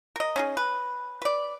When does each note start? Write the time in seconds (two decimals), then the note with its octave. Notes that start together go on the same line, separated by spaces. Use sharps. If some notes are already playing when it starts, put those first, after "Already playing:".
0.16 A#4 D#5
0.36 C#4 D#4 G#4
0.57 B4
1.22 B4 D5